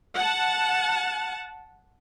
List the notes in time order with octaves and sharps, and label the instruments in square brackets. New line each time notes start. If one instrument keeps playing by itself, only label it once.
[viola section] F#5 A5